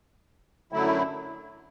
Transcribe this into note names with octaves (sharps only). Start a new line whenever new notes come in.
F#2 D3 F#3 A3 E4